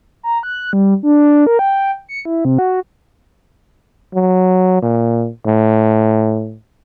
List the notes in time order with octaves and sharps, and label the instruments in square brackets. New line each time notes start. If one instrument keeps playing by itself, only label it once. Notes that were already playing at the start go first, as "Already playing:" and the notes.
[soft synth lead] A#5
F#6
G3
D4
A#4
G5
C#7
E4
C3
F#4
[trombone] F#3
A#2
A2